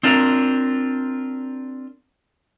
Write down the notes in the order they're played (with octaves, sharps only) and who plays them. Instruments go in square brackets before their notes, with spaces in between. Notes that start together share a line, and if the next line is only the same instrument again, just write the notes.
[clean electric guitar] C4 D4 F4 A#4